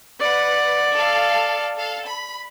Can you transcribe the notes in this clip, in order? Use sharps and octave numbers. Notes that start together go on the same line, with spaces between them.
B4 D5 F#5
A4 F5
A4 F5
B5